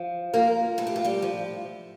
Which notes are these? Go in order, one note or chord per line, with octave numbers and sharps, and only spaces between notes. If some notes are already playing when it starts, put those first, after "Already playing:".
Already playing: F3
F3 A#3 A#4
A2 A4
G4
F4
G3 G4
F3